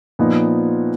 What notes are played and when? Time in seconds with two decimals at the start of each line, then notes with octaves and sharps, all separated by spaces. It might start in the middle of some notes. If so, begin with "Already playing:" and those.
0.19 A#2 F3 B3 D#4